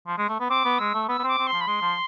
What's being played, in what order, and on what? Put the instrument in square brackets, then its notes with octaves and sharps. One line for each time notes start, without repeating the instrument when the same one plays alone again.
[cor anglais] F3
G#3
A3
B3
[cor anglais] C4 [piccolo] D6
[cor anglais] B3
[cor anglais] G#3 [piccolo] E6
[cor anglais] A3
[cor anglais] B3 [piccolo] E6
[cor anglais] B3
C4
[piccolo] D6
[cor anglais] C4
[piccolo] C6
[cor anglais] F3
[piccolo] B5
[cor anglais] G#3 [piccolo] C6
[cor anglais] F3